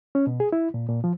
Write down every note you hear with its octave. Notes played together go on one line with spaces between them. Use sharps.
C#4
B2
G#4
E4
A#2
A#2
F3